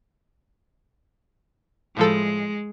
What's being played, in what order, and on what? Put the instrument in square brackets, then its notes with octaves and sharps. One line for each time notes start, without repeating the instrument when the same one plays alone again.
[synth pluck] A2 F3 A4 [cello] G#3